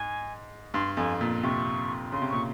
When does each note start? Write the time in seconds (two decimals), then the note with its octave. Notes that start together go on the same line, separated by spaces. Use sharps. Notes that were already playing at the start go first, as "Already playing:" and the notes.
Already playing: G#2 G#5
0.74 G2 C6
0.97 F2 G#5
1.21 A#2
1.44 C3 C#6
2.12 C#3 C6
2.22 C3
2.30 A#2 C#6